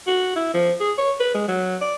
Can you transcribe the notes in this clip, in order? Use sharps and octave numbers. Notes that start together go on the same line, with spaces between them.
F#4
E4
F3
G#4
C#5
B4
G#3
F#3
D5